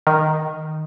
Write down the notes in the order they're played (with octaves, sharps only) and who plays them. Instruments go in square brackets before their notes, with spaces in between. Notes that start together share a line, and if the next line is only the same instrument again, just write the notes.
[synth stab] D#3